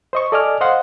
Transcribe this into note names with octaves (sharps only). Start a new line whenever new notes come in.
C5 D#5 C#6
A4 D5 D#5 G#5 D6 F6
C5 D#5 F5 F#5 C6